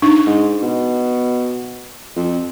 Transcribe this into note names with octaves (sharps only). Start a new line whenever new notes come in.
D4 D#4
G#2
B2
F2